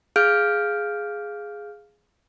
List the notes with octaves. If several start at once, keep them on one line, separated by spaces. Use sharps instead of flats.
G#4 F5 F6 G6 D7